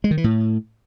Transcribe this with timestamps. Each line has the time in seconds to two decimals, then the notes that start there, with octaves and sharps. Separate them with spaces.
0.04 G#3
0.11 D#3
0.17 E3
0.24 A2